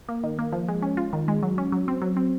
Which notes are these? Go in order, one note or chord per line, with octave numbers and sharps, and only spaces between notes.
A#3
D#3
A#3
F3
G#3
C#4
F4
D#3
G#3
F#3
C#4
F#3
C4
F#3
C4